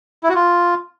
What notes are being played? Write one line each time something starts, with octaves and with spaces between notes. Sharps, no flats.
E4
F#4
F4